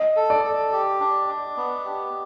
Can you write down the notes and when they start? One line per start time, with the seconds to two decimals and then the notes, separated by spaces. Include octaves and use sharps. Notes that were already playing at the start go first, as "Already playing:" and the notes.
Already playing: D#5
0.16 A4
0.30 D5
0.45 A4
0.72 G4
1.00 D4
1.28 D4
1.57 B3
1.85 G4